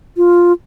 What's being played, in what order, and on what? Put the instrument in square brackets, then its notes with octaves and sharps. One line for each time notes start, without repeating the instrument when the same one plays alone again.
[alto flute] F4